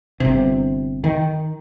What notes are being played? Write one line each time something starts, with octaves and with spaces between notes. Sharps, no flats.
G1 C3
D#3